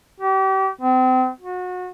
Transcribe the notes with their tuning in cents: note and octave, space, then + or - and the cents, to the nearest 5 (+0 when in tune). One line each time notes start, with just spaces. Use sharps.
G4 -35
C4 -35
F#4 -30